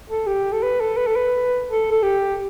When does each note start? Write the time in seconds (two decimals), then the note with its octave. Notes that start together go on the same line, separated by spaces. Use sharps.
0.10 A4
0.27 G4
0.52 A4
0.63 B4
0.80 A4
0.97 B4
1.07 A4
1.16 B4
1.68 A4
1.91 A4
2.03 G4